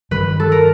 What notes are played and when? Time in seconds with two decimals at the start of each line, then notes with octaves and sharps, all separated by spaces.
0.11 G2 D#3 G#3 B4
0.40 A4
0.52 A#4